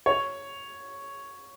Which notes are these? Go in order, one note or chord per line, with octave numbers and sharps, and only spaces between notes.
C#5